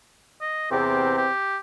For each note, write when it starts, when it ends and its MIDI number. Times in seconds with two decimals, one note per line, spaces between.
0.41 0.71 75
0.71 1.25 40
0.71 1.25 48
0.71 1.32 60
0.71 1.16 67
1.18 1.58 67